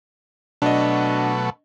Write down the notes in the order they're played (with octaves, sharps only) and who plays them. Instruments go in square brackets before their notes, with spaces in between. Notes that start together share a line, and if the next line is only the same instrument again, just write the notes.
[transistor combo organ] B2 F#3 A3 [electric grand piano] D4 D#5